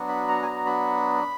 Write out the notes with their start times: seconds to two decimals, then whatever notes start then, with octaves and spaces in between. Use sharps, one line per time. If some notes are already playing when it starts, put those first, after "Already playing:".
Already playing: F#3 B3 D4 F#4
0.09 B5
0.28 A#5
0.43 G#5
0.47 A#5
0.66 B5